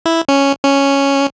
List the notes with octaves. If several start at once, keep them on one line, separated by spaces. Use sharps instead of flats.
E4
C#4
C#4